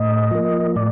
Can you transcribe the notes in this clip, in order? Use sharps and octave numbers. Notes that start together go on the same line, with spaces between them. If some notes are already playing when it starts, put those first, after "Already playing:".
Already playing: A2 D#5
F3 A#3
A2 D5